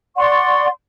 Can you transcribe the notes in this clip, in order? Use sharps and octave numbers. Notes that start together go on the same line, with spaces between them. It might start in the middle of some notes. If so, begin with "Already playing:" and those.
D5 F#5 C6 C#6